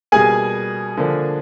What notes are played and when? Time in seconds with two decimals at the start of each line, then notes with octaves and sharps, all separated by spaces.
0.12 B2 G3 A#3 G#4 G#5
0.97 D3 F3 A#3 D4